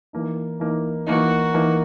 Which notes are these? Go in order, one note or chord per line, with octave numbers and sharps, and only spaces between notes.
E3 A#3 D#4
E3 A#3 D#4
E3 A#3 D#4 F#4
E3 A#3 D#4